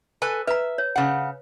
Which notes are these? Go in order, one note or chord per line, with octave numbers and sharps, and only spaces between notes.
A4 B4 G#5
B4 E5 A#5
C#5
C#3 F#5